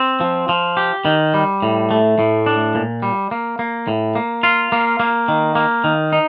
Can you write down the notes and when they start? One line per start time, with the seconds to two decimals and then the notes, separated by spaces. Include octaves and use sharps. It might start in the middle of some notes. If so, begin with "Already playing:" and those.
Already playing: C4
0.21 F3
0.49 F3
0.77 G4
1.05 D#3
1.34 G3
1.62 A2
1.91 A3
2.19 A2
2.46 D4
2.75 A#2
3.02 G3
3.31 A#3
3.59 A#3
3.88 A2
4.15 A#3
4.43 F4
4.72 A#3
5.00 A#3
5.28 D#3
5.55 A#3
5.84 D#3
6.13 D#4